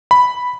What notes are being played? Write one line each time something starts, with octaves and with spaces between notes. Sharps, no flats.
B5